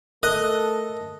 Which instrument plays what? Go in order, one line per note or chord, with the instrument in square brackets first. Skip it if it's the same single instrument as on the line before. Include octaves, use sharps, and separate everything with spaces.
[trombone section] A3 A4 [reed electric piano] A#4 [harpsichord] D#5 [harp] F#6